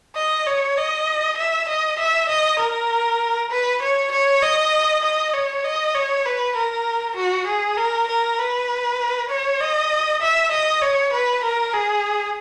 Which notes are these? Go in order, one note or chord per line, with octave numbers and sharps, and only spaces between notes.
D#5
C#5
D#5
E5
D#5
E5
D#5
A#4
B4
C#5
C#5
D#5
D#5
C#5
D#5
C#5
B4
A#4
F#4
G#4
A#4
A#4
B4
C#5
D#5
E5
D#5
C#5
B4
A#4
G#4